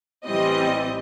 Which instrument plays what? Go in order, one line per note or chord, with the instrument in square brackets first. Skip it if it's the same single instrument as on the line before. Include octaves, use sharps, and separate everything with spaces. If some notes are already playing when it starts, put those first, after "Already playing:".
[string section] A1 E3 G3 C4 D#5